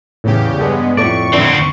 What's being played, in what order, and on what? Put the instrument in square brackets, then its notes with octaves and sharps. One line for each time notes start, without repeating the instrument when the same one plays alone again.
[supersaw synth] E2 C#3 G4 [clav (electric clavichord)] A2
[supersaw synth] G2 G#3 B3 [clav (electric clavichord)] A4 G5
[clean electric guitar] F2 A2 D5 [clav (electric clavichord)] A3 [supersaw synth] C#6
[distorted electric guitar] D2 C4 [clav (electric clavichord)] D4 E4 B4